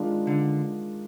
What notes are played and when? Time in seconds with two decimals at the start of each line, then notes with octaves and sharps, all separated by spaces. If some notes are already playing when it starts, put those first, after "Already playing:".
Already playing: D#3 G#3 D4 F4
0.27 D3